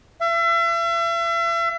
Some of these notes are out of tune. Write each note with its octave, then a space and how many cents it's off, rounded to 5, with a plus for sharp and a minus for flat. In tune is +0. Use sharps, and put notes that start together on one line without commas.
E5 +40